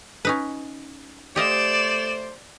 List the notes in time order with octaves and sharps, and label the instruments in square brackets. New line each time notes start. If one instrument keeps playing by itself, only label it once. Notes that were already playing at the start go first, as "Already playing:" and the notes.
[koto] C#4 D#4 B4
[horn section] A3 C5 [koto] G4 D#5 F5 [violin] D5 E7